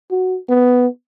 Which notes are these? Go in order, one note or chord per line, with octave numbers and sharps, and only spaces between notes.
F#4
B3